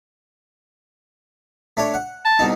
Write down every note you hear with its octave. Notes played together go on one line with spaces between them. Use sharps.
A3 D4 C#5
F#5
A5
C2 B2 D#4